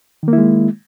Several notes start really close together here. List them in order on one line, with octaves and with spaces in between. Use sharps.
D#3 A#3 E4 G#3